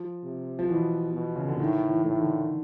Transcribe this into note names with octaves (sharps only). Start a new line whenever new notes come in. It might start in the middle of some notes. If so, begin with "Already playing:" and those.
Already playing: F3
C3
F3
B2 E3
B2
C#3
D3
A2 D#3
E3
A2
D#3
D3